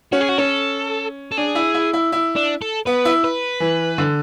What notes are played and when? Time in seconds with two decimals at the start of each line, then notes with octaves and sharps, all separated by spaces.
0.12 C#4 F#4
0.21 G#4
0.29 F#4
0.38 C#4 A4
1.31 A4
1.37 D4 G#4
1.55 E4
1.74 E4
1.93 E4
2.12 E4
2.36 D4
2.62 A4
2.86 B3 B4
3.05 E4
3.24 B4
3.60 E3
3.98 D3